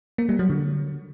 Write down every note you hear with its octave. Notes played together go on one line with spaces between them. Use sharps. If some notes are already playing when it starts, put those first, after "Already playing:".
A#3
G3
F#3
D3